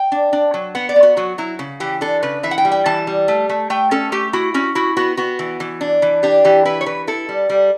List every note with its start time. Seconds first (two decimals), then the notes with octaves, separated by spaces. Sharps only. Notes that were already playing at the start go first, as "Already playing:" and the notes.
Already playing: G5
0.12 D4
0.33 D4
0.54 F#3
0.75 B3 F#5
0.89 D5
0.96 B3
1.03 F#4
1.17 F#3 F#4
1.38 F#3 E4
1.59 C#3
1.80 E3 G4
2.01 D4 A4
2.23 C#3 B4
2.43 E3 E5
2.51 F#5
2.58 G5
2.65 G3
2.72 G5
2.86 E3 A5
3.07 G3
3.28 A3
3.49 A3
3.70 A3 G5
3.91 C#4 A4
4.12 A3 G4
4.33 E4 F#4
4.54 C#4 F#4
4.75 E4 F#4
4.97 B3 F#4
5.17 B3 F#4
5.39 E3
5.60 E3
5.81 D4
6.02 E3
6.23 D4 G4
6.45 E3 G4
6.65 E4 B4
6.81 C#5
6.86 E3 B4
7.07 E4 A4
7.29 G3
7.49 G3